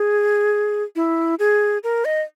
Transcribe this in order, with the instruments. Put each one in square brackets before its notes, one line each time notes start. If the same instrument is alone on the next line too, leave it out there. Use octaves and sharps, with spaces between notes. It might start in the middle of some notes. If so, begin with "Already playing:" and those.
Already playing: [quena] G#4
E4
G#4
A#4
D#5